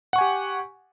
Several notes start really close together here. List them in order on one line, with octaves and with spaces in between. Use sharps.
F#5 C#6 G#5 G4